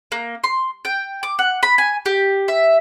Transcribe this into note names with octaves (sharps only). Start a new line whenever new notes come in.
A#3
C6
G5
D6
F#5
B5
G#5
G4
E5